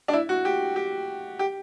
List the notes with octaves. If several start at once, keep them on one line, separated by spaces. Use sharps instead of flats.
D4
E4
F#4
G4
G4
G4